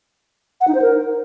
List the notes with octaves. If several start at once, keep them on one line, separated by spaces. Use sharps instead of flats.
F#5
D#4
C5
A#4